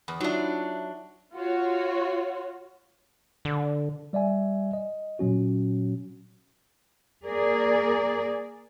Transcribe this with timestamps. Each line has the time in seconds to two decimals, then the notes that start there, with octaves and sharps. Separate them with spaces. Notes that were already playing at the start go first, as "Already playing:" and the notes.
0.08 E2 B5 D#6
0.21 F#3 D4 D#4 F4 E5
1.35 F4 F#4 C#5
3.45 D3
4.13 G3 D5 E5 G#5
4.73 D#5
5.19 A#2 F#3 C#4 F#4
7.27 A#3 G#4 A#4 D5